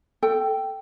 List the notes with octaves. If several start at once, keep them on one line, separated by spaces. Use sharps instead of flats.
A4 G5